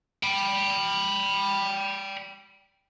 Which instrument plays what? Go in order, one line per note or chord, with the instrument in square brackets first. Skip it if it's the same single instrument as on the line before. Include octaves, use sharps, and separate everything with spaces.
[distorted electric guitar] G5 B5